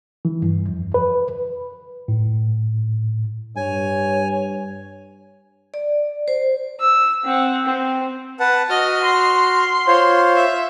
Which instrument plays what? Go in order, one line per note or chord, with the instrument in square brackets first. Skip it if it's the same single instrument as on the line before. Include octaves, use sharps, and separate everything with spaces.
[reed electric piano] E3
G2
F2
B4
[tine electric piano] A2
[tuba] G2 [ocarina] C#5 [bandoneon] G#5
[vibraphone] D5
C5
[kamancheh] E6
C4 F#5
C4
[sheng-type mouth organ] B4 F#5 A5
[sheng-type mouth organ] F#4 F6 [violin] D#5
[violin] C6
[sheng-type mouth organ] F4 C5 C#5
[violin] E5